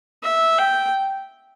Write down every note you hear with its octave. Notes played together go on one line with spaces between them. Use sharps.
E5
G5